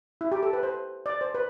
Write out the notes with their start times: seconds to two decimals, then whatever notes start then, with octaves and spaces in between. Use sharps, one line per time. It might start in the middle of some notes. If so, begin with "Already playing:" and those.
0.21 E4
0.32 G4
0.43 A4
0.53 B4
0.63 C5
1.06 D5
1.21 C5
1.35 B4